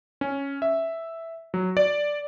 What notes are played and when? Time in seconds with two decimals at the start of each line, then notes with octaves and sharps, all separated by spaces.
0.21 C#4
0.62 E5
1.54 F#3
1.77 D5